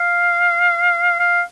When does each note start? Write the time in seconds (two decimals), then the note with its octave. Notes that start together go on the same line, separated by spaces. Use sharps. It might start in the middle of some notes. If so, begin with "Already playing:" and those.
Already playing: F5
1.19 F5